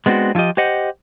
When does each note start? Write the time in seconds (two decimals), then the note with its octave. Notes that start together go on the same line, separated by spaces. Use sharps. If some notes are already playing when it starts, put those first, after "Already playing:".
0.06 G#3 B3 C4 D4 F#4
0.35 F3 E4 F4 G4 D#5
0.57 G4 C5 D#5 F#5